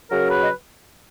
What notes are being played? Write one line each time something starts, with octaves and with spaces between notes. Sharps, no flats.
C#3 F#3 A#4
B4
D#5